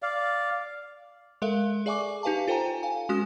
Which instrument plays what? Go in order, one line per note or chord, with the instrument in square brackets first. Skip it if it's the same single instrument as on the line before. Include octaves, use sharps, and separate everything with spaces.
[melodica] D5 F5
[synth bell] G#3 A4 A#4 E5 F5
G#4 D5 E5 G#5 C#6 D6
D#4 G4 B4 F5 G#5 A5
F4 A4 C5 G5 G#5 A#5
F5 G#5
G#3 C#4 F#4 D#6